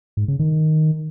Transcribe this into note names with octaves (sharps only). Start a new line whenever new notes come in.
G#2
C#3
D#3